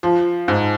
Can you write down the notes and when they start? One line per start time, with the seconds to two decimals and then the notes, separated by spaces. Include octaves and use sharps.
0.03 F3
0.48 G#2